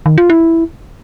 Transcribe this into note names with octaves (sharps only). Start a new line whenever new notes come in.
D#3
F4
E4